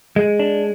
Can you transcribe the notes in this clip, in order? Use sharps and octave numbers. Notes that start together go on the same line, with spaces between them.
G#3
D4